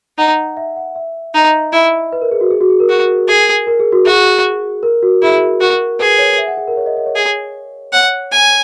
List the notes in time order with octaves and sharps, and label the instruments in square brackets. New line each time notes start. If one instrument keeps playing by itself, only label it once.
[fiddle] D#4 [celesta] F#5
[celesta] E5
F#5
E5
[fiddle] D#4 [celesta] D#5
[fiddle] E4
[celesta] B4
A#4
G#4
F#4
G#4
F#4
G#4
A#4
[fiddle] F#4
G#4
[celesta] A#4
G#4
F#4
[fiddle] F#4 [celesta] G#4
[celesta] A#4
F#4
[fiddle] E4 [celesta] G#4
[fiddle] F#4 [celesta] A#4
[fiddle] G#4 [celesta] B4
[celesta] C#5
E5
F#5
G#4
A#4
C#5
D#5
D#5
C#5
[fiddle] G#4
[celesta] C#5 [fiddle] F#5
[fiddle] G#5